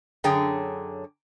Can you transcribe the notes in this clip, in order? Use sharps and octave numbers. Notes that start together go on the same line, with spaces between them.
F#2 D3 F#3 G#4 C#5 G5